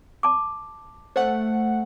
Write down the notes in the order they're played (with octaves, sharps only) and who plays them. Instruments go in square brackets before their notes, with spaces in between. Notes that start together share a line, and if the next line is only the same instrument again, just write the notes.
[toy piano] A5 D6
[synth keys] A3 F#5 [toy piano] C5